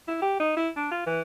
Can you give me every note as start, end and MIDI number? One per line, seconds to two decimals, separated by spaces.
0.08 0.17 64
0.22 0.38 67
0.40 0.55 63
0.57 0.69 64
0.76 0.88 62
0.91 1.05 65
1.06 1.21 52